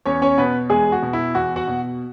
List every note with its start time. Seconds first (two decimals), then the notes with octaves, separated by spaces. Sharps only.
0.06 E2 C#4 C#5
0.22 C#4 C#5
0.38 B2 B3 B4
0.70 E2 G#3 G#4
0.92 F#4
1.02 B2
1.13 E4
1.35 E2 F#4
1.56 F#4 F#5
1.68 B2